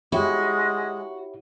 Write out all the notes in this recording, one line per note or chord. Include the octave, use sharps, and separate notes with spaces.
G#3 E4 F#4 G4 C#5